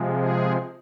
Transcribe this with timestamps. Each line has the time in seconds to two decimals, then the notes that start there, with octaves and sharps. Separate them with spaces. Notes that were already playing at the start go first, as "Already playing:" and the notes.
Already playing: C3 F3 G#3
0.14 G#4